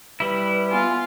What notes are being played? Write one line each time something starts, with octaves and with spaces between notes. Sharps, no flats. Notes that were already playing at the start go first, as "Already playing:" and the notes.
G3 E4 B4
B3 F4 G#5